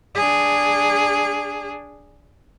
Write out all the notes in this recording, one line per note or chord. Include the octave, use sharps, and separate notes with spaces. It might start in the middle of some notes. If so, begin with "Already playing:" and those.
D4 G#4